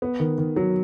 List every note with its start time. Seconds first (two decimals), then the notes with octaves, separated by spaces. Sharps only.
0.02 B3
0.20 D#3
0.38 D#3
0.56 F#3